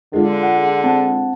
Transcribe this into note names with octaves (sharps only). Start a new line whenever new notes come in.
D3 G#3 F4
F#5
C4 F#5 A5